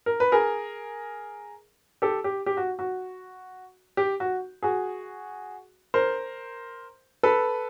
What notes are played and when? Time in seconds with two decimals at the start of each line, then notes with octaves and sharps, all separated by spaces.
0.06 A#4
0.20 B4
0.32 G#4 A#4
2.02 G4 A4
2.24 G4
2.46 G4
2.57 F#4
2.79 F#4
3.97 G4
4.20 F#4
4.63 F#4 G#4
5.94 A#4 C5
7.23 A4 B4